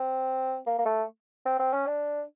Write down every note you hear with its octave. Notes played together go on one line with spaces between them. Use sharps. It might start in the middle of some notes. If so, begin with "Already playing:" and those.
Already playing: C4
A#3
A#3
A3
C4
C4
C#4
D4